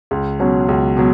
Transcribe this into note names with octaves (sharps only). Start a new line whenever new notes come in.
C#2
B2 F#3 C#4
C#2
B2 F#3